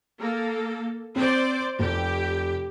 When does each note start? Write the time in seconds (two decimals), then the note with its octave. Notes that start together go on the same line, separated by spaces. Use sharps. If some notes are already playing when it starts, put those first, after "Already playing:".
0.20 A#3 A4
1.16 C4 C5 D5
1.79 F1 G4